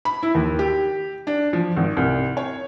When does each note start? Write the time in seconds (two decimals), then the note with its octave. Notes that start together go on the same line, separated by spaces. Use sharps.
0.05 B5
0.23 E4
0.35 D#2
0.59 G4
1.27 D4
1.53 F3
1.77 G#1
1.97 C2
2.37 C#5